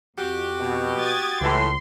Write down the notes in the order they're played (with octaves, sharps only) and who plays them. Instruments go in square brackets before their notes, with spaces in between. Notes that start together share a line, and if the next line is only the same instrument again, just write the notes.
[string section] F2 [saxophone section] F#4 G4
[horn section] B2
[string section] D#6 G#6 A6
[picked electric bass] C#2 [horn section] A2 E3 [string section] C6